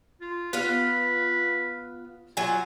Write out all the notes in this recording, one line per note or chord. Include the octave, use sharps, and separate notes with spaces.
F4
B3 F4 B4 F5
F#3 F4 G#5